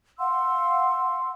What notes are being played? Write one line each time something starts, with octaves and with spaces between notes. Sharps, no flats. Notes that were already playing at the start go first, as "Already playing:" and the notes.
F5 F#5 C6 E6